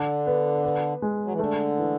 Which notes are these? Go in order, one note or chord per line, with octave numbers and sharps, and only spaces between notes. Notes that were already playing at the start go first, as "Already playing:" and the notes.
Already playing: D3 D4
B3
B3
G#3
F#3
E3
D3 A3
E3